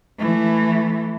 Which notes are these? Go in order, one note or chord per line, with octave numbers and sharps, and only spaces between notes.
E3 A3